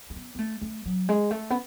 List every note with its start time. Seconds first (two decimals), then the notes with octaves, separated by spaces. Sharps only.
0.10 A3
0.16 B3
0.35 B3
0.39 A3
0.61 A3
0.86 F#3
1.09 G#3
1.31 A3
1.50 B3